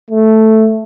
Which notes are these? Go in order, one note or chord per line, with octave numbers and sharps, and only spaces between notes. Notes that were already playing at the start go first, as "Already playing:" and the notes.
A3